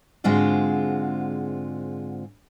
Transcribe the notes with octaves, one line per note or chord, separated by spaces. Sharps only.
G#2 D3 G#3 C4 F4 F#4